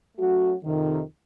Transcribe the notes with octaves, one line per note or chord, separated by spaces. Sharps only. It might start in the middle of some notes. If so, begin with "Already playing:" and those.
F#3 A3 C#4 F#4
F2 C3 D#3